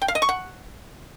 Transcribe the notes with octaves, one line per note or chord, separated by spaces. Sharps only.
G5
F5
D#5
C#6
F#5